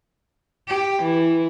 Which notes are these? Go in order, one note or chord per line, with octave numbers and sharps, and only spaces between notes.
G4
E3